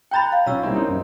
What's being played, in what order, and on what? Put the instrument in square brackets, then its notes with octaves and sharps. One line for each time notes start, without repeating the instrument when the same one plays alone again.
[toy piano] G5 A#5 B5 [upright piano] F#6 G6 A6
[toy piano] F5
[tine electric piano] B1 [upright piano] C#4 F4 [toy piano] C#5 E6
[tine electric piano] G3 D#4 E4 [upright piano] A#3 C4
[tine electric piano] C#4 D#4
F#2